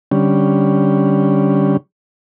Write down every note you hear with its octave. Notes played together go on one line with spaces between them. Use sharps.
D3 G3 C#4